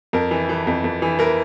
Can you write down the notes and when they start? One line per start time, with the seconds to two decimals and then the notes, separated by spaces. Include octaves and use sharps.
0.13 F2 A#4
0.31 E3
0.49 E3
0.67 F2
0.84 F2
1.02 E3
1.19 E3 A#4